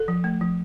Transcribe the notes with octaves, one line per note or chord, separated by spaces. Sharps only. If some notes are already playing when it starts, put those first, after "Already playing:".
Already playing: A4
F3
A3
F3